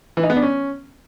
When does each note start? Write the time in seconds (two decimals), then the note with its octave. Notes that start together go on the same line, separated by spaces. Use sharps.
0.17 E3
0.23 D#4
0.30 B3
0.36 D4
0.43 C#4